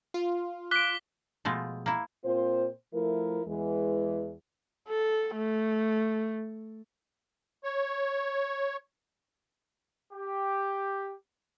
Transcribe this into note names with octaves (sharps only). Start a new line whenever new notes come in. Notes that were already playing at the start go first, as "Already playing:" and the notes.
F4
D6 F#6 B6 D7 G7
B2 F3 G#3 A3
A#3 E4
A#2 C4 F4 C5
F3 A3 E4 A#4
E2 E3 G#3
A4
A3
C#5
G4